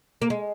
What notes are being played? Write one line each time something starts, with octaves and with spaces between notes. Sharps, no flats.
A#3
G#3